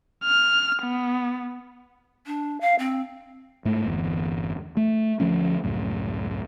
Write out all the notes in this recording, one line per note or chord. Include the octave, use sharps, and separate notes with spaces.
F6
B3
D4
F5
C4
G#2 A3
G1 E2
A3
D2 F3 A3 C#4
C#2 F#2 A2